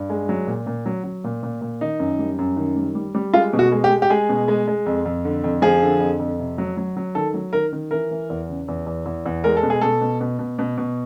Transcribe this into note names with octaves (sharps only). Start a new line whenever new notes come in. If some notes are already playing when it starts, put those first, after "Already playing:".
Already playing: G2
G#3
F#3
A#2
A#2
F#3
F#3
A#2
A#2
A#2
D#3 D#4
F#2
G3
F#2
D#3
G3
G3
G3
G#3 F4
B2
F#4
G#3
G4
G#3
G4
G#3 G#4
B2
G#3
G#3
F2
F2
D3
F2
F3 G#4
D3
F2
F2
C3
F#3
F#3
F#3
D#3 A4
F#3
D#3 A#4
D#3
E3 A#4
E3
E2
C#3
E2
E2
E2
E2
G#3 A#4
A4
B2
G#4
B2 A4
B2
B2
B2
B2
B2